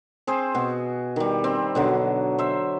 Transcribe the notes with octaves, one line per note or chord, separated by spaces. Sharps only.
C4 G#4 C5
B2 F#4
D#3 G3
C4
B2 D3 F#3
C5 E5